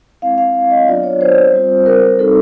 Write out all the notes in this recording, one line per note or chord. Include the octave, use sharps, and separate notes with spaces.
G#3 C4 E4 F5
F5
D#5
F#3 B3 D4 F4 D5
C#5
C5
G3 C4 F4
A#4
G3 C4 D#4 F#4 A4